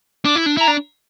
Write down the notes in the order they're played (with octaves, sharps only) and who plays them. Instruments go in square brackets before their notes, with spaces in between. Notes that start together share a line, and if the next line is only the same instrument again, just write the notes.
[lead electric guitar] D4 [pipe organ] D6
[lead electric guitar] E4
D4
[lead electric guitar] E4 [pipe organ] A#5
[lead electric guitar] D4